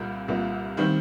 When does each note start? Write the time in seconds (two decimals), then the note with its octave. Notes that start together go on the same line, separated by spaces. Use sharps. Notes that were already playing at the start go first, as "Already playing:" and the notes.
Already playing: C2 A#2 G3 A#3
0.28 C2 A#2 G3 A#3
0.77 D#3 G3 C4